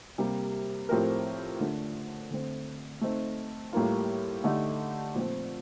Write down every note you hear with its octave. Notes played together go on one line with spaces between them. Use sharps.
C3 G3 A#3
A2 F3 C4 G4 A#4
D3 A3 D4 A4
D3 A3 C4
A3 C4 D#4
A2 G3 A#3 F4
D3 A3 D#4 G4
A#2 F3 A3 C4